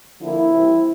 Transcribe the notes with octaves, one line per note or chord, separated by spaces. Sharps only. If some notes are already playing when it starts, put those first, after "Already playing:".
D3 F3 A#3 E4
C3 E3 G3 C4